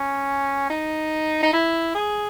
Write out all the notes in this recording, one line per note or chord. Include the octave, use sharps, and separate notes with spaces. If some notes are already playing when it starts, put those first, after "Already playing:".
Already playing: C#4
D#4
D#4
E4
G#4